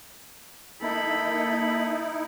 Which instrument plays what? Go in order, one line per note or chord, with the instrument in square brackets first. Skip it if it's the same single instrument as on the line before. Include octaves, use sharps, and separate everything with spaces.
[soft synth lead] A#3 [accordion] D#4 E4 [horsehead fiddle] A4 B5